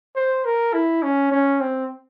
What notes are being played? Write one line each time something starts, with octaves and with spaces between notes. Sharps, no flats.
C5
A#4
E4
C#4
C#4
C4